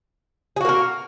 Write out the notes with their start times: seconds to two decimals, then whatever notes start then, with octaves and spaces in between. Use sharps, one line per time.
0.56 G#4
0.61 F#4
0.65 A#3
0.69 A#4